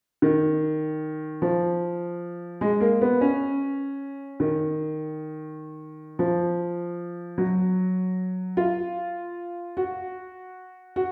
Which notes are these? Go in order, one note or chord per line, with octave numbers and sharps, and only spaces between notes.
D#3
F3
G#3
A#3
B3
C#4
D#3
F3
F#3
F4
F#4
F#4